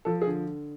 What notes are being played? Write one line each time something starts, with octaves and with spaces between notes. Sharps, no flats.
F3 A4
G#4
D3